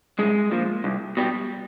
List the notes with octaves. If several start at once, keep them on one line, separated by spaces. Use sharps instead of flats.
C2 G#3
A#2 F3
C2
B2 G3